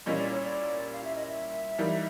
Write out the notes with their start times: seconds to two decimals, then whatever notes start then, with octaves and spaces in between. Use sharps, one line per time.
0.06 A#2 G3 A#3 C#4 E4 D#5
0.18 D5
0.31 C#5
0.42 D5
0.92 F5
1.04 E5
1.16 D#5
1.27 E5
1.78 E3 G3 A#3 D#4